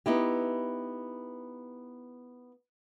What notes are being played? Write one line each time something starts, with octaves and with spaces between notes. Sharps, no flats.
B3 D#4 E4 G4